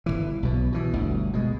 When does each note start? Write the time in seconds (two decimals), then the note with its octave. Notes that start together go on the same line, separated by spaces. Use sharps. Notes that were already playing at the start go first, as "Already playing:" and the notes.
0.06 G1 C#2 E3
0.43 B1 B2
0.72 B2 E3
0.93 G1 D2
1.33 B2 G#3